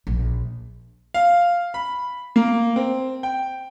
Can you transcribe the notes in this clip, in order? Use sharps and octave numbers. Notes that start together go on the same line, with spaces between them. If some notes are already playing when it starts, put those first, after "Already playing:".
A#1
F5
B5
A#3
C4
G5